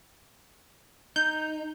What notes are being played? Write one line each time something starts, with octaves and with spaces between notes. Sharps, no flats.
D#4 G6